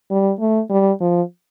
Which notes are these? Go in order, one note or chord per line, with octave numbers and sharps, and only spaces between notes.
G3
A3
G3
F3